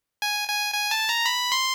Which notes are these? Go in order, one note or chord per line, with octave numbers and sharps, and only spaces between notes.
G#5
G#5
G#5
A5
A#5
B5
C6